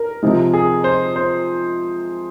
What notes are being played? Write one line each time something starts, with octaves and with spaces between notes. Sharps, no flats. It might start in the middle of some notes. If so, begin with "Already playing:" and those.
Already playing: A#4
C3 F3 G#3
G#4
C5
C5